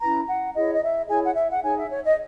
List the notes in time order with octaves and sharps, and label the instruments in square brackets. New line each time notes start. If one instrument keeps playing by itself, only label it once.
[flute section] C#4 E4 B4 A#5
F#5
E4 G#4 C#5 D#5
D#5
E5
E4 G#4 C#5 G#5
F#5
E5
F#5
D#4 G#4 C#5 G#5
E5
C#5
D#5